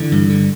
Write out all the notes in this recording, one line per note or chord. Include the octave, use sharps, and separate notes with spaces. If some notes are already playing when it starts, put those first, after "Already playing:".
Already playing: D3 E3
G2
D3